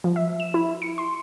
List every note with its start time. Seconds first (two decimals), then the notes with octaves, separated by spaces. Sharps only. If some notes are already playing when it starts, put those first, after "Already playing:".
0.04 F3
0.16 E5
0.40 E7
0.54 E4
0.82 C#7
0.98 C6